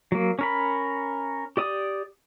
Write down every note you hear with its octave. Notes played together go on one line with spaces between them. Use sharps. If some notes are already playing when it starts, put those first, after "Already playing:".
F#3 A#3
C#4 A#4 B5
G4 D5 D#6